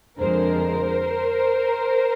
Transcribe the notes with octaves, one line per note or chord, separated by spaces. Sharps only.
F2 D3 F3 G#3 A#4 C5